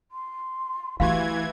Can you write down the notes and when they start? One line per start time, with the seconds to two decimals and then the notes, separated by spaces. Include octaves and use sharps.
0.11 C6
1.00 E3 A3 E4 F#4 G4 F5 G#6